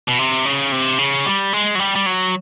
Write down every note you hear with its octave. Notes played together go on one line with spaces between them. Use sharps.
B2
C3
C#3
C3
C#3
G3
G#3
F#3
G3
G3
F#3